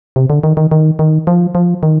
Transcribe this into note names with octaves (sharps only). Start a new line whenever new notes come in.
C3
D3
D#3
D#3
D#3
D#3
F3
F3
D#3